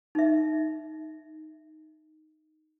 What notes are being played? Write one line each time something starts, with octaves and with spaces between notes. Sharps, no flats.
D#4 E5